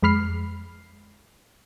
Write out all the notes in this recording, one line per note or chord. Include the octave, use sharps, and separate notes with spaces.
F2 G#3 B5 F6 C7